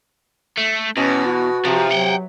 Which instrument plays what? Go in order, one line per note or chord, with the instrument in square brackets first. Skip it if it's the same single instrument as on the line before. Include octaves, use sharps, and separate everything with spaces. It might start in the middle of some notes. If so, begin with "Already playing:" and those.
[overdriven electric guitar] A3
[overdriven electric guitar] E2 [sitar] B2 [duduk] C#4
[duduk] F#4
[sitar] C3 [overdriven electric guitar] F3
[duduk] F#3 [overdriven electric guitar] F#5 G5